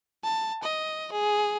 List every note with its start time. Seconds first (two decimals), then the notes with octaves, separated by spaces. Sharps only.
0.24 A5
0.63 D#5
1.12 G#4